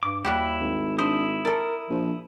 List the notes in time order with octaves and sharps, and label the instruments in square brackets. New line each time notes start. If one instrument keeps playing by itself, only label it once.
[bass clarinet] G2 [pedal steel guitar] D6
[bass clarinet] D#2 [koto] G3 F#4 G4 [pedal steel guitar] E4
[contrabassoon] G#1
[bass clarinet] D4 [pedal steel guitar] E4 D#6 [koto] C5
[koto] A4 D5 [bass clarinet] A#4
[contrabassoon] A#1 [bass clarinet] F3